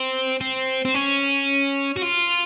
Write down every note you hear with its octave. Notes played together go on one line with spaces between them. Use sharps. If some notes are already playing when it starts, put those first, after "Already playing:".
Already playing: C4
C4
C4
C#4
F#4
F4